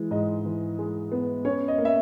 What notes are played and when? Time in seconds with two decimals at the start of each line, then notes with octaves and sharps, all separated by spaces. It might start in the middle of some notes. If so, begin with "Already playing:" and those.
Already playing: E3 G#3
0.11 G#2 D#5
0.45 E3
0.79 G#3
1.12 B3
1.45 C#4 C#5
1.68 D#5
1.78 A#3
1.85 E5